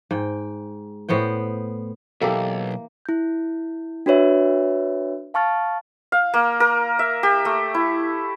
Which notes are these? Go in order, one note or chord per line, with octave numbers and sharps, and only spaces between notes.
G#2 G5
A2 B3 C5 G5
B1 E3 A#3 G4 A4
E4 G6
D4 F#4 B4 C#5 E5
F5 A5 C#6 F6 A6
F5
A#3
A#4
E5
G4
A3
E4